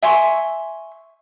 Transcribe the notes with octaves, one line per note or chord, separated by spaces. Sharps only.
E5 G#5 C6 C#6